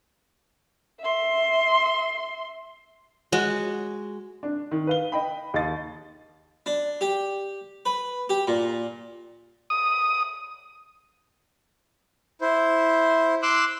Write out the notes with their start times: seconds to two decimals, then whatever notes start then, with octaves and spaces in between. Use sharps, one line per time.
1.00 E5 C6
3.32 G#3 F#4
4.43 D4
4.72 D#3
4.87 B4 F5 G7
5.12 D#5 G5 B5
5.54 D#2 D#5 A6
6.66 D4
7.01 G4
7.85 B4
8.29 G4
8.47 A#2
9.70 D#6
12.41 E4 C5
13.43 C6 D6 E6 F#6